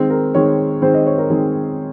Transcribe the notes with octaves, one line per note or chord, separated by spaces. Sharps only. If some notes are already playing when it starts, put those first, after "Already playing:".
Already playing: D#3 G#3 C4
A#4
D#3 G#3 C4 C#5
D#3 G#3 C4 C5
D#5
C#5
A#4
D#3 G#3 C4 G#4